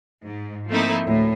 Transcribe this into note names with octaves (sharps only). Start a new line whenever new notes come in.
G#2
F3 A3 A#3 C4 D#4 E4
D2 A2